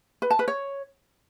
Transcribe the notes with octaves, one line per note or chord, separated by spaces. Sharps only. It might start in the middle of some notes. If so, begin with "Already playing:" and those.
B4
A5
B4
C#5